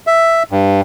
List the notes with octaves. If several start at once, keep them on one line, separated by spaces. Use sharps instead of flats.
E5
G2